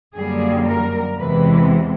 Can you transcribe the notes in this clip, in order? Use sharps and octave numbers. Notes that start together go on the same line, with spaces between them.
F#2 D3 G3 A#3 G#4
A#4
E2 C3 E3 G#3 B4